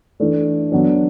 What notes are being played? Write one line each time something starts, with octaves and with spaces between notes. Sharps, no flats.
E3 A3 D4
F#3 B3 D4